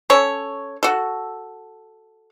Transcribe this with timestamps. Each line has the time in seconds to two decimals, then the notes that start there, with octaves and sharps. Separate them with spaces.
0.10 C#4 A4 C#5
0.83 F#4 A4